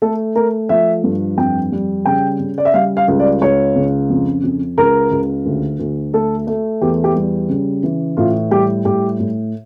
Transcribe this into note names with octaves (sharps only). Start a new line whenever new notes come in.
A3 A4
A3 A#4
F3 E5
G2
F2 G5
G3
C#3 G5
C#3
D5
E5
G3 F5
F5
C#2
D5
C#2 C#5
C#3
F2
F2
C#2 A#4
C#2
D2
D2
A3 A4
A3
E2 G4
G4
G3
C#3
E3
A2 F4
G3 G4
A2 G4
A2